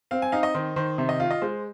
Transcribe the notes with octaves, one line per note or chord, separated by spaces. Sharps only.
C4 F5
G#5
D#4 F5
D#5
D#3 C5
D#3 C5
C3 C5
D#5
F4 F5
D#5
G#3 C5